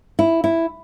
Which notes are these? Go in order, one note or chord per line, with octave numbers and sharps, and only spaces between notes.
E4
E4